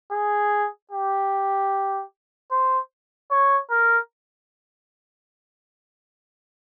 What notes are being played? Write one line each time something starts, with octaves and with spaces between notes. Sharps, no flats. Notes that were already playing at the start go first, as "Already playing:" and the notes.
G#4
G4
C5
C#5
A#4